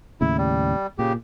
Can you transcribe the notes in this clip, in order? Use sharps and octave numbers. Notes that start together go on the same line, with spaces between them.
D#2 A2 C#3 E4
G3
A#2 C#3 G4